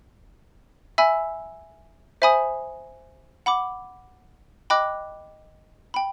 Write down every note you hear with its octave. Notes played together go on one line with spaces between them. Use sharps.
E5 G#5 B5 E6
C5 E5 G#5 B5 D#6
F#5 B5 D6
D#5 G5 B5 D6 F#6
G5 B5